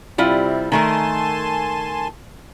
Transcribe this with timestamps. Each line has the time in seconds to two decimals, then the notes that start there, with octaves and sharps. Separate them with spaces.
0.18 C3 G3 C4 E4 F4
0.72 D#3 A3 A#4 G#5 A5 C6